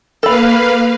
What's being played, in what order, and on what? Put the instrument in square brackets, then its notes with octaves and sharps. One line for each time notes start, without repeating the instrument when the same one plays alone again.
[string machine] A#3 B4 F5 [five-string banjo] A4 B5